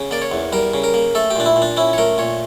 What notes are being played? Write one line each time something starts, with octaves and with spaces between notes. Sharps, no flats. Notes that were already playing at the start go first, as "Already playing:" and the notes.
Already playing: C#3
A#3 D5
C#5
E2
G3 A#4
C#3
A#4
A#3
A3 A4
G4
A#2 D4
E4
A#2
D4
C#4 E4
C#5
A3 A#4
A#2 C#5